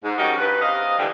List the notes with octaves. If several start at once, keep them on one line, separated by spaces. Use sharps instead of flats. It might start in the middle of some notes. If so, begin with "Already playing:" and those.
G#2
F3 G3 C#4 D#4 F#4 A#4
G2 B4
C3 D#5 F5
G#2 D3 E3 G3